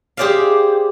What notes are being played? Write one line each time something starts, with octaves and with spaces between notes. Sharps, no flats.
G4 G#4 C5 D5 E5 F5